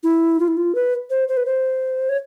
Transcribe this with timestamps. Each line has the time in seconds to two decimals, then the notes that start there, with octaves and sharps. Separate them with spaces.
0.03 E4
0.40 F4
0.48 E4
0.57 F4
0.75 B4
1.10 C5
1.28 C5
1.37 B4
1.46 C5
2.09 C#5